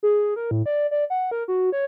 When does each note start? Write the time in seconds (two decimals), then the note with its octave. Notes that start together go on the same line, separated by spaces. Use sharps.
0.03 G#4
0.36 A#4
0.51 A2
0.66 D5
0.91 D5
1.10 F#5
1.31 A#4
1.48 F#4
1.72 C#5